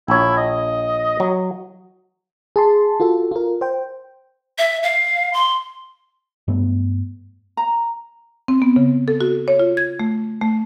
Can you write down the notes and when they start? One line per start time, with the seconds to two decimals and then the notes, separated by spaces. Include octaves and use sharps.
0.08 A#1 E4 C#5
0.37 D#5
1.20 F#3
2.56 G#4 A5 C6
3.00 F4 F#4 A4
3.31 F4 A#4
3.61 C5 G5
4.58 E5
4.83 F5
5.33 C6
6.48 G2 F#3 A3 B3
7.57 A#5
8.48 C4
8.62 B3
8.76 C#3
9.08 A4
9.21 F#4
9.48 C#5
9.60 F4
9.77 G#6
10.00 A3
10.41 A3